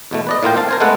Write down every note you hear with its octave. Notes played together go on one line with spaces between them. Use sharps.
E2 B2 A3
B4 D5 D#5
A2 A#3 F4 G5
C4 F5 A5
A#4 C5 G#5
G#3 A3 B3 A4 F#5